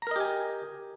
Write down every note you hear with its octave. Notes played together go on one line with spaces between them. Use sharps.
G4 A#4 D#5 G#5 A#5